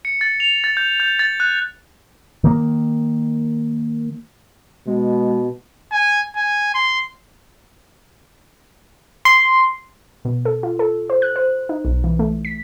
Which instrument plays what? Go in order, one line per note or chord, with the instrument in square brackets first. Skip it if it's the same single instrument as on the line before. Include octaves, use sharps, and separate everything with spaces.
[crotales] C#7
A6
F7
A6
G6
G6
A6
F#6
[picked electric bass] D#3 A#3
[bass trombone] B2 [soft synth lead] G#3
[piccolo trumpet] G#5
G#5
C6
[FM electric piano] C6
[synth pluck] B2
A4
F4
A4
C5
F#6
C5
D#4
B1
E3
A3
B6